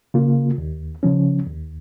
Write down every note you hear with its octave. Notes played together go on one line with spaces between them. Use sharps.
C#3 A#3 F4
D#2
C#3 F3 C#4
D#2